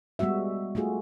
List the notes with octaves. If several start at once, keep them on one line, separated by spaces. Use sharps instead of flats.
G3 G#3 B3 F#4 E5
A3 F4 F#4 G#4